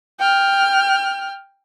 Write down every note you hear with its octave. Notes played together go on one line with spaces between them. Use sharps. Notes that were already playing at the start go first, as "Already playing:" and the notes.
G5 F6